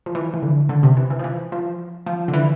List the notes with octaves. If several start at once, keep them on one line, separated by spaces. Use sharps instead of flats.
F3
E3
E3
D3
D3
C3
E3
E3
F3
E3
F3
F3
D3
E3